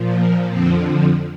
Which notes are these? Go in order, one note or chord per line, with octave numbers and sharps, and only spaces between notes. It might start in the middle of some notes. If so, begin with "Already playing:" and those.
Already playing: A#2 F3
A#3
F2 D3 F3 C4